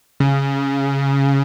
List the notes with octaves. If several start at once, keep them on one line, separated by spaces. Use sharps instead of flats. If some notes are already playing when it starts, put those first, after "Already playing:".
C#3